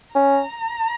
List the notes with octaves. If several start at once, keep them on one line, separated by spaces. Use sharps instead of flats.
C#4 A#5